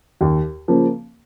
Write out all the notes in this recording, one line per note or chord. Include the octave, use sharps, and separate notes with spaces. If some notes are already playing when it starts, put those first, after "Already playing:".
D#2
C#3 F3 A#3